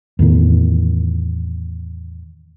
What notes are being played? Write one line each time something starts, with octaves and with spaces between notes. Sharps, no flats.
E2 A2 D#3